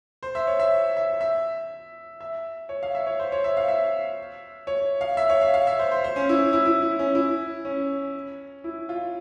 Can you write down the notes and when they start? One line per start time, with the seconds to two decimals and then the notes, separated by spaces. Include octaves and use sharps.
0.23 C5
0.35 E5
0.47 C#5
0.60 E5
0.97 E5
1.21 E5
2.20 E5
2.69 C#5
2.83 F5
2.95 E5
3.07 C#5
3.19 C5
3.32 C#5
3.44 E5
3.57 F5
3.68 E5
4.67 C#5
5.01 F5
5.17 E5
5.30 C#5
5.41 F5
5.54 F5
5.67 E5
5.79 C5
5.91 C5
6.04 C5
6.16 C#4
6.29 E4
6.53 E4
6.65 E4
6.82 E4
6.99 C#4
7.15 E4
7.65 C#4
8.64 E4
8.89 F4